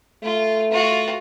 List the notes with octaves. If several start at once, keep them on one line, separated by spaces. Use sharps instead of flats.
A3 F4
F4 F#4